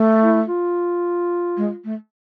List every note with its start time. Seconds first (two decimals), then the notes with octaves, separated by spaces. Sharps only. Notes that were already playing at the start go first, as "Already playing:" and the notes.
Already playing: A3
0.21 E4
0.48 F4
1.57 G#3
1.84 A3